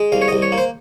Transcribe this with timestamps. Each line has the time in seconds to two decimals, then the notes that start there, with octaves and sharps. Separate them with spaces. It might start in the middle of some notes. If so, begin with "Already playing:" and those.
Already playing: G#3
0.12 C2 F5
0.22 C#5
0.28 C2 D#5
0.42 C#5
0.52 A#3
0.58 C5